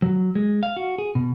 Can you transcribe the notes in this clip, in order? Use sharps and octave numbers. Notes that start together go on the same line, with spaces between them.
F#3
G#3
F5
F#4
G#4
B2